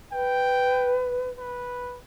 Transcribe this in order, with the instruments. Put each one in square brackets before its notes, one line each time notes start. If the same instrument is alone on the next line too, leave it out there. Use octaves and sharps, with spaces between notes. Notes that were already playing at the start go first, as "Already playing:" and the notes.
[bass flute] B4 [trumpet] G5
[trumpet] B4